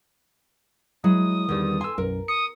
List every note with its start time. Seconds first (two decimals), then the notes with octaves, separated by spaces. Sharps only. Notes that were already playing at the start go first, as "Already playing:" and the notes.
1.04 F#3 G#3 E4 D#6
1.49 E2 D3 D#3 G3
1.81 A4 G#5 C6 E6
1.98 B1 F#2 A#4
2.28 D#6 C#7